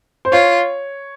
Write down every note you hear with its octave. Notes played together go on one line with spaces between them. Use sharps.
C5
F4 C#5